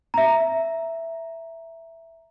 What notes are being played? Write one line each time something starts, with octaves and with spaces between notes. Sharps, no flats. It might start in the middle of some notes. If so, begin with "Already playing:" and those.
E5 A#5